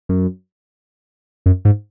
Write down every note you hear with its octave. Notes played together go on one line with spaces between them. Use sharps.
F#2
F#2
G#2